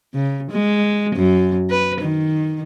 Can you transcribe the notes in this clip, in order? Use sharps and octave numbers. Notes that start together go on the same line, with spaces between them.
C#3
G#3
F#2
B4
D#3